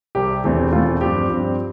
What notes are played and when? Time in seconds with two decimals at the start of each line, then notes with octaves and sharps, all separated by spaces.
0.15 C2 C3 G3 G4
0.44 E1 E2 E3 A3 C4
0.72 E1 E2 E3 A3 C4 F4
1.01 G2 F3 C4 G4
1.30 G2 F3 C4